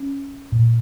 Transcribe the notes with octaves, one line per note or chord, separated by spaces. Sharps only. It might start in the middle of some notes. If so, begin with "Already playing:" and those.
Already playing: C#4
A#2